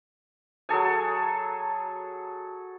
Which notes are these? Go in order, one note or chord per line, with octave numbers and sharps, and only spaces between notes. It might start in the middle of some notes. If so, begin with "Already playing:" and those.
F#3 G#4 A4 G#5